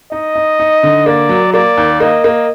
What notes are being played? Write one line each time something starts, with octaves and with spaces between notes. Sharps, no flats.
D#4 D#5
D#4
D#4
D3
A#3 D5
F#3
A#3 D5
D#2
A#3 D#5
A#3